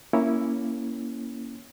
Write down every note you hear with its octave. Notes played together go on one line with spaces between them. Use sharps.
A#3 C#4 E4 C#5